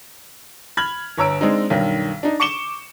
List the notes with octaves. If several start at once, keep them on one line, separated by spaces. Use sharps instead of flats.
B5 F6 G#6 F#7
G1 C#5 A#5 E6 D7
G#3 C4 D4 D#4
B1 G2 D#3
D4 D#4
C#6 D6 C#7 E7 G7